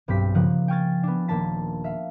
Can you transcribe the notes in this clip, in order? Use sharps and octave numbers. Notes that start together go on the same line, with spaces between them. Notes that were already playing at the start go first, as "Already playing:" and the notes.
B1 G2 C4 G4 B6
C#3 F3 A#3 F#5
G5 G#5 C#6 F6 G#6 A6
B3 D4
D#1 A#3 D4 A5 B6
E5 F5